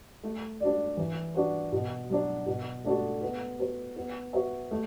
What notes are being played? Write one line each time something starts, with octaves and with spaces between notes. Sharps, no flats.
A3
D4 F#4 D5
E3
D4 F#4 B4
B2
F#3 D4
B2
A3 D4 F#4 A4
B3
F#4 B4
B3
F#4 B4 E5
A3